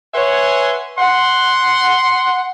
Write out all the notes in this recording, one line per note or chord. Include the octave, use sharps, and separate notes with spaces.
B4 C#5 E5 F#5 G#5 C6
F#5 C6